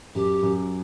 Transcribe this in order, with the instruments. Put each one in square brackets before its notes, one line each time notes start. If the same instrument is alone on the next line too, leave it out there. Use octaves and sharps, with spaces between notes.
[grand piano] F#2 [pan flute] G4
[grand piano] F#2